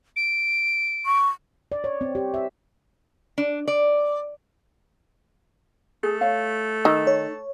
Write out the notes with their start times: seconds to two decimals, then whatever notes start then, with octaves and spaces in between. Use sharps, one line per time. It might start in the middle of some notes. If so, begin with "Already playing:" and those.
0.16 D7
1.06 C#6
1.72 D5
1.84 C#5
2.01 C4
2.15 G4
2.34 E5
3.38 D4
3.68 D5
6.03 A3 G#4
6.21 C#5 F5
6.85 D#3 D#4 E6
7.07 C#5